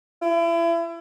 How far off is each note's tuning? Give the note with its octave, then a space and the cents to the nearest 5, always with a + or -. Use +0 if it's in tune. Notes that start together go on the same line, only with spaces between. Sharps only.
E4 +35